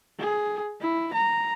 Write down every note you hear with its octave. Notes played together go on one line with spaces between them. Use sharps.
G#4
E4
A#5